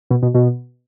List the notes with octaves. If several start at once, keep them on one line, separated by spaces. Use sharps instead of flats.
B2
B2
B2